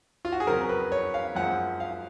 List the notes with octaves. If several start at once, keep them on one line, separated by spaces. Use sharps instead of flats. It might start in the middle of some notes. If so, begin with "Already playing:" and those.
F4
F#4
G#4
F2 C#3 F#3 A#4
B4
C#5
F5
F#2 F3 G#3 F#5
F5